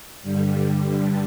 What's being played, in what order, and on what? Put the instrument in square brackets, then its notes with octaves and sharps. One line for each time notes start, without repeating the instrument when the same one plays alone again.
[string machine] G2 D3 G3